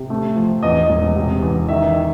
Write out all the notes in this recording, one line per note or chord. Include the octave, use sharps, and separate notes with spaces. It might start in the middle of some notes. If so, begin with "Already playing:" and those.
Already playing: C3
A3
F3
E2 D#5
E1
C3
E2
D#3 E5
D#3